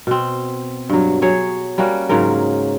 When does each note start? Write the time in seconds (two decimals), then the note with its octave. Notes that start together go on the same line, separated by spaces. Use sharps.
0.07 B2 C4
0.89 G2 F#3
1.22 F#3 G#4 C#5
1.78 G3 A#3 C#4 F#4
2.09 G#2 C#3 F#3 A#4